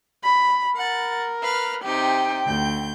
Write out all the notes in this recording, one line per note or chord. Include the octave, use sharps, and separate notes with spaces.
B5
A#4 F#5 A6
B4 F5 F6
C3 D#4 G4 G5
D2 G6